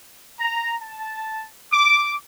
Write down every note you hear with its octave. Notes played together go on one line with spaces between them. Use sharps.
A#5
A5
D6